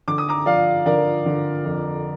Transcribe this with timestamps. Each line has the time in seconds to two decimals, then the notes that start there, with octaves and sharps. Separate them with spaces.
0.08 D3 D6
0.18 D#6
0.28 A#5 D6
0.46 F3 D5 F5
0.85 D3 A#4 D5
1.26 D3
1.64 F2